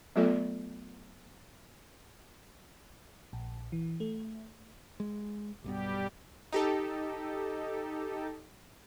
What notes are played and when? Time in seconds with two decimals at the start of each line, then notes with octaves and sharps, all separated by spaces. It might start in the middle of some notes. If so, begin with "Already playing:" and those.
0.16 F#3 A3 B3 F4 A4 D5
3.33 A#1
3.72 E3
4.00 A3
5.00 G#3
5.64 B1 G2 B2 G3 G4
6.52 D#4 G4 A4